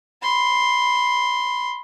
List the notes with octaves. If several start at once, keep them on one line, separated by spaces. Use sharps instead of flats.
B5 C6